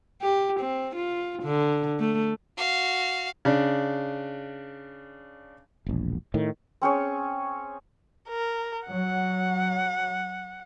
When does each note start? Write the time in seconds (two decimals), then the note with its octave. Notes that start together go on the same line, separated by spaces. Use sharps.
0.22 G4
0.60 C4
0.95 F4
1.43 D3
1.99 A3
2.57 F#4 F5
3.45 C#3 D4
5.86 E1 A#1
6.34 A2 D#3
6.81 C4 C#4 G#4 C#5
8.29 A#4
8.88 F#3 F#5